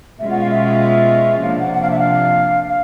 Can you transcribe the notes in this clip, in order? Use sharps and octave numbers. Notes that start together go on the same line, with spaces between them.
B2 G#3 C#4 F4 E5
F#5
F5
E5
E5
C3 F3 A#3 D4 F5
F#5
F#5
F5
E5
F5
F5